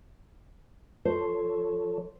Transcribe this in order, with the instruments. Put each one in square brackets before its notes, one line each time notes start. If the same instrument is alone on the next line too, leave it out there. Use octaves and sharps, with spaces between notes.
[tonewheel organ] F3 A4 C#5 [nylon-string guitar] C5